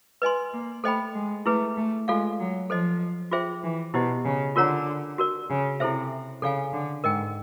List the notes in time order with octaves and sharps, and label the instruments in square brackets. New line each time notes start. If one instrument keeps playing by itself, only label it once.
[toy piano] B4 D#5 G#5 C6
[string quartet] A#3
[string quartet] A3 [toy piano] A4 C5 D#5 G5 B5
[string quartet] G#3
[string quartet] A3 [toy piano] E4 G#4 B4
[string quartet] A3
[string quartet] G#3 [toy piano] F4 A4 D5 F5
[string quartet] F#3
[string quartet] F3 [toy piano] A4 C5 D#5
[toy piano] F4 G#4 C5 E5 G5
[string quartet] E3
[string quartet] B2 [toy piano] E4 G4 C5 D#5
[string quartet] C#3
[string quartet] D3 [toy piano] F4 A#4 C#5 F#5 A#5
[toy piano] F#4 A#4 D5
[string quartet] C#3
[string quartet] C3 [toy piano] E4 A4 C5 E5
[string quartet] C#3 [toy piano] A4 D5 F5 G#5
[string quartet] D3
[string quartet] G#2 [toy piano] A#4 D#5 G5